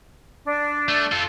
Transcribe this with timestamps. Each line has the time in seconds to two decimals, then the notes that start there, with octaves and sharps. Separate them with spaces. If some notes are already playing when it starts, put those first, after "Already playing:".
0.46 D4
0.88 A3
1.12 F4 A4